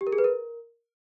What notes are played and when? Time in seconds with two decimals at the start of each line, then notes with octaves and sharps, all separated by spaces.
0.01 G4
0.07 A#4
0.13 G#4
0.18 B4
0.24 A#4